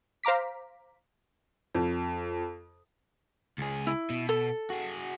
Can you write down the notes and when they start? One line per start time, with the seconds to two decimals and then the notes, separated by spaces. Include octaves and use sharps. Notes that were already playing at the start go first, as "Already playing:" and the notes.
0.24 C5 F5 A#5 D6 B6
1.75 F2
3.58 C#2 G#4
3.87 E4
4.10 B2
4.29 A4
4.70 F#4 G#4